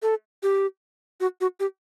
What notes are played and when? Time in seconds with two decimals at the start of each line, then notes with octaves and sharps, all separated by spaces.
0.02 A4
0.43 G4
1.20 F#4
1.41 F#4
1.60 G4